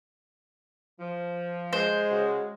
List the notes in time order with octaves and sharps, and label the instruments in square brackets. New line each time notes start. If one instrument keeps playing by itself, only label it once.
[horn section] F3
[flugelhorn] G#3 [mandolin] C5
[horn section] C#3 F#4